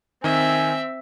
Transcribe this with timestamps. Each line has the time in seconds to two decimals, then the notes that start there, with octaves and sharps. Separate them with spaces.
0.24 D#3 C4 E5 G#5